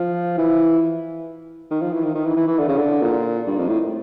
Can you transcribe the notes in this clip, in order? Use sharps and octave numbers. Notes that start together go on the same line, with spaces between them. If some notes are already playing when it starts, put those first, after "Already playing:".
Already playing: F3
E3
D#3
F3
E3
D#3
D#3
E3
E3
E3
D3
C#3
D3
A#2
G2
F2
A2